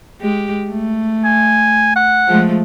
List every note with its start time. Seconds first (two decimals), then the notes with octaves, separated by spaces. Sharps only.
0.20 G#3 G4
0.71 A3
1.25 G#5
1.96 F#5
2.27 F3 G#3 A3